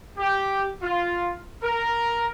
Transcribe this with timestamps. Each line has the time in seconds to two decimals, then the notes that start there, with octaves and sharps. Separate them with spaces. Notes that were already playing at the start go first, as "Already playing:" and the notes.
0.18 G4
0.82 F4
1.62 A#4